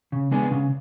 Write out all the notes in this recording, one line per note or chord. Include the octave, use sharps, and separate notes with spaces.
C#3
G#3 B3 D4 G#4
C#3